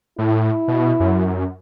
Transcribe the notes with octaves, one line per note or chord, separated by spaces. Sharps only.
A2 E4
B2
F#2